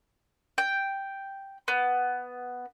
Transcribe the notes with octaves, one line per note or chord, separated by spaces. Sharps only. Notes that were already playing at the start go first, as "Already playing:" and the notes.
G5
B3